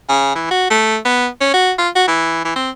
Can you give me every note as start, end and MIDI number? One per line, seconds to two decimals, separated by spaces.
0.09 0.33 49
0.35 0.48 52
0.50 0.69 66
0.70 0.97 57
1.05 1.27 59
1.40 1.49 61
1.53 1.72 66
1.78 1.89 65
1.95 2.05 66
2.08 2.40 52
2.44 2.52 52
2.56 2.70 60